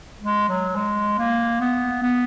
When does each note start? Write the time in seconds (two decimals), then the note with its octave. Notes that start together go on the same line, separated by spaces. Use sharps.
0.21 G#3
0.48 F#3
0.76 G#3
1.18 A#3
1.60 B3
2.02 B3